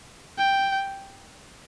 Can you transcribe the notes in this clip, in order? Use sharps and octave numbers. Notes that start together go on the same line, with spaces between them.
G5